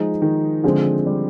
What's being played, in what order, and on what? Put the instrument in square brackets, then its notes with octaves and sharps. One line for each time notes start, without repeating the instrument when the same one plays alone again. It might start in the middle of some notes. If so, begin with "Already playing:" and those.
Already playing: [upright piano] F3 G#3 D#4
[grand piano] D#3
[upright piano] D3 G#3 C4 [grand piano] F3
[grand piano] G3